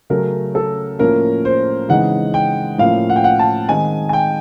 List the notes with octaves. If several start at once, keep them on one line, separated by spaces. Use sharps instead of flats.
C#3 F#3 A3 C#4 A#4
A4
A2 F3 A#3 C#4 A#4
C5
C#3 E3 G#3 C4 D#4 F#5
G5
A2 F3 A#3 C#4 F5
F#5
G5
F#5
A5
D#3 G#3 C4 D#4 G#5
G#5
G5